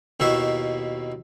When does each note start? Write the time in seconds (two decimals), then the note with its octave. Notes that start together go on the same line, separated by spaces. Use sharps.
0.20 D#2 B2 D#3 E4 E5 C#6